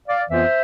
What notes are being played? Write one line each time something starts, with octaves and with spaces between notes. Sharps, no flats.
D5 F5
F2 E3 B3 F4 C5 E5